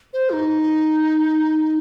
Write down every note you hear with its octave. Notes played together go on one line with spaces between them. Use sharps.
C5
F4
D#4